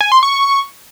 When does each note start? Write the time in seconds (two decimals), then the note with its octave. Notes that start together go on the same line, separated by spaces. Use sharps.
0.01 G#5
0.12 C6
0.23 C#6